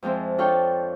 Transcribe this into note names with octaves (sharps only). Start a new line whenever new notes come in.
F2 F3 G#3 C4 E4
D4 F4 A4 C#5 G5